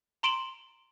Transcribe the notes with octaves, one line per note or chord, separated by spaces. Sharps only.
A#5 C6 D7 E7 F#7